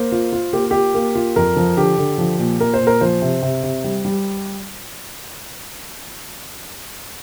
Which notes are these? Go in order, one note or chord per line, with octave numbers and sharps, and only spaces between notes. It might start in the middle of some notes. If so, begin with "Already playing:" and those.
Already playing: A#3 C5
F4
F4
A#3 G4
F4 G4
A#3
F4
F2 A#4
F3
D3 G4
D3
F3
A#2
A#2 A#4
C5
A#2
A#4
F3 C5
C3
C3
C3
G3
G3